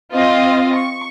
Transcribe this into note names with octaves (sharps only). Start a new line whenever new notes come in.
C4 F4 D#5 F5
C#6